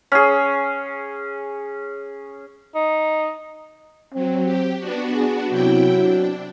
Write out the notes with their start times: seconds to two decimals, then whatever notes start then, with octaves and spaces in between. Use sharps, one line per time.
0.12 C#4 G#4
2.75 D#4
4.14 F#3 C4
4.44 G4
4.80 B3 D4 F#4
5.14 G#4
5.50 C3 F#3 E4 G5
6.01 D4